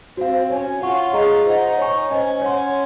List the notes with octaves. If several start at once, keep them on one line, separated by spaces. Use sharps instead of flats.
C4 F#4 C5 F5
C#4 F#4 C#5 G#5
F4 C#5 F#5 C#6
G#4 D#5 A#5 C#6
D#4 C5 D#5 F#5
C#5 G#5 C#6
C#4 C5 D#5 G#5
C#5 F#5 C6